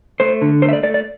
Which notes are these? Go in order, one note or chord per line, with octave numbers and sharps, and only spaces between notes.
A3 C5
D3
A3 C5
E5
D5
A3 D5
D5